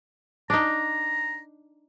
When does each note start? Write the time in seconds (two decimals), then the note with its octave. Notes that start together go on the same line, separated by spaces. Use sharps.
0.50 D4 D#4 A#5